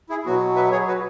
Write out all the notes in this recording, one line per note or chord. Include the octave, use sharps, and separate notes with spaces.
E4 G#4
B2 F#3 B3 F#4
B4 E5
G#4 C#5
F#4 B4